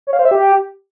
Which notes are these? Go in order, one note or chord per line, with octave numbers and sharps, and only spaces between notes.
C#5
F5
C5
E5
G4